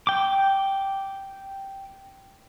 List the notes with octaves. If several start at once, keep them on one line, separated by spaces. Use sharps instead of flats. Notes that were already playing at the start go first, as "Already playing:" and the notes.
G5 D6